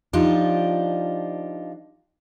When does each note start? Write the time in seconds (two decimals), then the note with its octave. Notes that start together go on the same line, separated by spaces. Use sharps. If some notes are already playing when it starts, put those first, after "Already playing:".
0.13 F3 D4 D#4 F4 G4